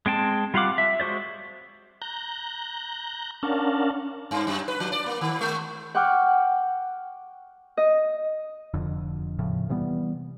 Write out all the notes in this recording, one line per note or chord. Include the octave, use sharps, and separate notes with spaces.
G#3 C4 G5 A5
G3 F4 F5 F#5 D6
E5
G#3 F#4 C5 D5
A#5 F#6 G6
C#4 D4 A#4 F5 F#5 A5
G2
F#2
B4
F3
D5
A#3
D#3
G#3
F#5 G5 C#6 D6 F6 F#6
D#5
F1 F2 D3
E2 A2 C#3 F3
C3 E3 G3 B3